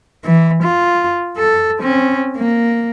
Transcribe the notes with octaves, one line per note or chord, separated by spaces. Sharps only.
E3
F4
A4
C4 C#4
A#3